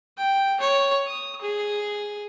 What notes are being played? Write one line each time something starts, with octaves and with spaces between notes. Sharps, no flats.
G5
C#5
D#6
G#4